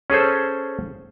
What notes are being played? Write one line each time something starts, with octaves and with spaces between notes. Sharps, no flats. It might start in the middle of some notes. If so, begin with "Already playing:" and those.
C#4 G#4 A4 C5